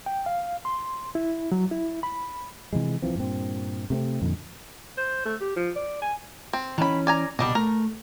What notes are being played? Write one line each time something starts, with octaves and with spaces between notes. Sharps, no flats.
G5
F5
C6
E4
F#3
E4
B5
C3 E3 F3 G#3
C2 E3 F3 C4
G2 A#2 C4
C3 A3 B3 C4
F2 A#2 D3 D#3
C5
A3
G4
F3
D5
G#5
C4
D#3 E3 C#4 B5
D5 G#5 A#5
C2 G#2 B2 G3 D4 D#5
A3 A#4